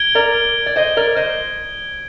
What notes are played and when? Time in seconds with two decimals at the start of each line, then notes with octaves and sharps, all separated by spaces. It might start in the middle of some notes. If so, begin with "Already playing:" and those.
Already playing: G#6 D7 G7
0.15 A#4 D5
0.66 D5
0.76 C5 D#5
0.97 A#4 D5
1.16 C5 D#5